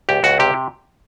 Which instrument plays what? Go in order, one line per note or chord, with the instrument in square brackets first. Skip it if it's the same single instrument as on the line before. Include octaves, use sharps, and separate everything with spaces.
[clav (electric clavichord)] C#2 G4
C#2 F#4
C3 G4